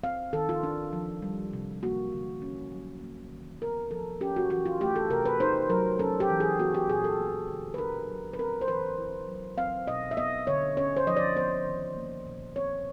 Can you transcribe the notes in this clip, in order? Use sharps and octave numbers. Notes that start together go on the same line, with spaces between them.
C4 F5
D#3 A4
F4
D4
F3
G3
C3
A#3 F#4
D3
C#4
F#3
A#3
D#3
B3 A#4
F3 A4
C#4 G4
F#4
E3 F#4
F4
A3 G4
A4
C3 A#4
B4
D#4 C5
F#3 A#4
C#4 A4
G4
E3
G#4
B3 F#4
G4
A#2 G#4
A4
A#3
D3
B4
D4 A#4
F#3
B4
C4 A#4
C5
E3 B4
E4
F#3
C4 F5
B2 D#5
E5
B3 D#5
D3 C#5
C#4 C#5
C5
F3 D#5
D5
B3 C5
D#3
A#3
A#2
C4 C#5